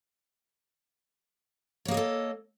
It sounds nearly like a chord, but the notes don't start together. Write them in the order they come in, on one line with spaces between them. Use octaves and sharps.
C#5 A#3 G#4 D#5 A4